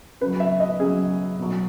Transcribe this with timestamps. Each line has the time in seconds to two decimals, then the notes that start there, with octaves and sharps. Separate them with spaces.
0.21 C#3 F#3 B4
0.40 E5
0.60 D#5
0.80 C#3 F#3 G#4
1.39 B2 F#3